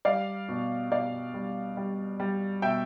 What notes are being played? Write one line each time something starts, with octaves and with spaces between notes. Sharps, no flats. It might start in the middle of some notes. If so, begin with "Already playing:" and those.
G3 D5 F5
B2
B2 D5 F5
G3
G3
G3
B2 E5 G5